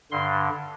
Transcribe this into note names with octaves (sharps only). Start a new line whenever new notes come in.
G2 D3 C6